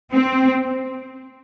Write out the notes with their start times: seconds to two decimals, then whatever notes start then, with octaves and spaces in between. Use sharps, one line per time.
0.14 C4